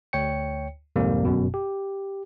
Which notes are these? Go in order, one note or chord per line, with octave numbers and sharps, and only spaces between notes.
D2 C#5 G5 C#7
C2 F2 G#2 G3 A#3
G1 F#2 B2
G4